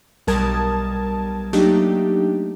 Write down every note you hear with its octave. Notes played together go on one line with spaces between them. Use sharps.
B1 G3 A#4 A5 D#6 G#6
F#3 A3 A#3 D4 D#4 G4